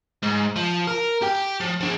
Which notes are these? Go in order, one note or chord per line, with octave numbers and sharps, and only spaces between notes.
G#2
F3
A#4
G4 G5
F3
F3 D4